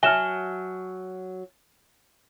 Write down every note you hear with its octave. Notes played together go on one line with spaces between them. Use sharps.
F#3 E5 G#5 A5 F6 E7 G7